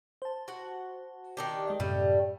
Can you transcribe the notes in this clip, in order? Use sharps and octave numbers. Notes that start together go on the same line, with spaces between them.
C5 A5
F#4 F#5
D#3 D4 G4
G#3 D#5
F#2 A2 C3 G3 A3